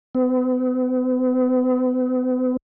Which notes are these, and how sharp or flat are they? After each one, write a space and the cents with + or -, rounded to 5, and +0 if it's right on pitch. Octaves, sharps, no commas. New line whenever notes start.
B3 +45